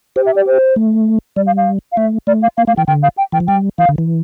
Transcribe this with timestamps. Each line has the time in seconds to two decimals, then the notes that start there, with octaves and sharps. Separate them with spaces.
0.16 G4 C5
0.26 E5
0.36 D5
0.47 C5
0.76 A3
1.36 G3 D5
1.46 F5
1.57 F5
1.92 F5
1.97 A3 E5
2.27 A3 D5
2.42 F5
2.57 A#3 F5
2.67 A3 F5
2.77 E3 G5
2.87 D3 G5
3.03 F5
3.17 G5
3.32 E3 G5
3.40 F3
3.47 G3 G5
3.78 E3 F5
3.89 D3
3.98 E3